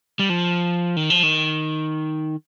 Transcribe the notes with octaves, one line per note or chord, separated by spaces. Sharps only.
G3
F3
D#3
F3
D#3